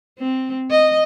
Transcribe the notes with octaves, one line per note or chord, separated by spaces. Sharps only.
C4
D#5